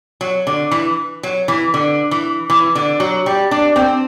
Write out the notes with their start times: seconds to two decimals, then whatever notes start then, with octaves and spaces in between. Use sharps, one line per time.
0.21 F#3
0.47 D3
0.71 E3
1.23 F#3
1.48 E3
1.74 D3
2.11 E3
2.50 E3
2.75 D3
3.00 F#3
3.26 G3
3.51 D4
3.76 C4